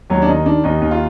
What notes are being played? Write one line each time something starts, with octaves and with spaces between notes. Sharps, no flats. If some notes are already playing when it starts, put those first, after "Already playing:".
D#2 F#3
D4
D#3 D#4
D#3 D4
D#2 D#4
D#2
F4